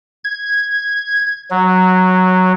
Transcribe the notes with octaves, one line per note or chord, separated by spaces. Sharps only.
G#6
F#3